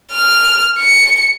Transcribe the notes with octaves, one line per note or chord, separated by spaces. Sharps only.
F6
C#7